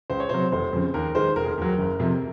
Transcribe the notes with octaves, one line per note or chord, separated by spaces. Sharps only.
C#2 C5
C#5
C3 F#3 C5
F1 C5
F2 C#3
D#2 A#4
D#3 G#3 C5
F1 A#4
G#4
A#4
D#2 D#3 F#3
F#1
F2 C3